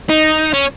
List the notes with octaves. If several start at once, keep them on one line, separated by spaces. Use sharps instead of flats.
D#4
C#4